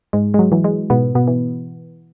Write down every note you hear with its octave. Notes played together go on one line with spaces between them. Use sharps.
G#2 G#3
G#3
F#3
E3 F#3
G#3
G#2 B2 B3
B2 B3
E3